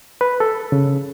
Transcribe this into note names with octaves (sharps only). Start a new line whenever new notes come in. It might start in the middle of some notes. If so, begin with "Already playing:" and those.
B4
A4
C#3